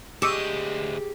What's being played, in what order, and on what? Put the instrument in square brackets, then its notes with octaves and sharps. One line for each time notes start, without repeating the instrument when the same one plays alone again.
[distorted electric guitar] D2 D#5 [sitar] G#3 [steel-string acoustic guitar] G4 [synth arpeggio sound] C#6 D6 E6